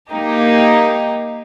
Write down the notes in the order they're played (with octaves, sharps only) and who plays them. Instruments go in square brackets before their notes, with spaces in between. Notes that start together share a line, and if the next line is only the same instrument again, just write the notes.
[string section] A#3 D#4 G4